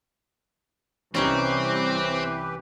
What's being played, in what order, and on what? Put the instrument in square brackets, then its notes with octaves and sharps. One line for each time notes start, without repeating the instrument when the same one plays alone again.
[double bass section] C2 [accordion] E3 G4 B4 [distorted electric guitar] C4 [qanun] C#4 D#4 C#5